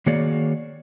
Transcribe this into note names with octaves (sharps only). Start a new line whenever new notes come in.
D#3 A#3 F#4 G#4 C#5 D5